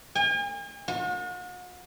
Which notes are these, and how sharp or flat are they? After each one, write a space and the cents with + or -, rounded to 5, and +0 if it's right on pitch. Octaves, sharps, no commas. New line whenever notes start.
G#5 -45
F#4 -45